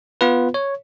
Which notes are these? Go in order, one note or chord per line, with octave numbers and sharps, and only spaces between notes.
B3 F4 B4
C#5